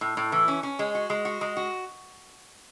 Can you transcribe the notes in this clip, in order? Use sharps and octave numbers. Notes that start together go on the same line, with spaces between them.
A2
A2
E3
C#4
C#4
G#3
F#4
G#3
F#4
G#3
F#4